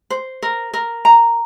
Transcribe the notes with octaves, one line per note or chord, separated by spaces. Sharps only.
C5
A#4
A#4
A#5